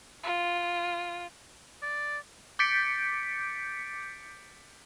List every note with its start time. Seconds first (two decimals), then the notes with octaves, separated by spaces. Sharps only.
0.23 F4
1.82 D5
2.59 D6 G6 A6 B6 C#7 D7